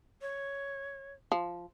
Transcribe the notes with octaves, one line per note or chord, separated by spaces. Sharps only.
C#5
F3